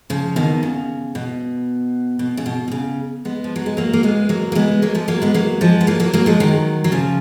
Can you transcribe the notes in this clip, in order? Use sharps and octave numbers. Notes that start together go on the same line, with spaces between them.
C#3 F3
B2 D#3
C#3
B2
B2
C#3
B2
B2
C#3
G#3 B3
F3
F#3
G#3
F#3 A#3
A#3
G#3 B3
F#3 A#3
A#3
G#3 B3
F#3 A#3
F3 G#3
F#3 A#3
G#3 B3
F#3 A#3
F3 G#3
B3
F#3 A#3
F#3 A#3
F#3 A#3
F3 G#3
D#3 F#3
F#3
C#3 F3